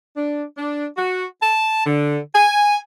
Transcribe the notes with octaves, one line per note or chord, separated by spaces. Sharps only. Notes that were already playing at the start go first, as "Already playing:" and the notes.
D4
D4
F#4
A5
D3
G#5